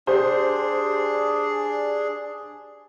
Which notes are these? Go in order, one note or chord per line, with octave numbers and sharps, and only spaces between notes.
D4 G4 G#4 C5